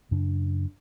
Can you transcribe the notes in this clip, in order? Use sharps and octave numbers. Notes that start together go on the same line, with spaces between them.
F#2 C#3 D4